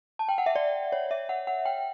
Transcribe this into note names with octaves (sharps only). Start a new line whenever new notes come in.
A5
G5
F#5
E5
D5
C#5
E5
F#5
F#5
G5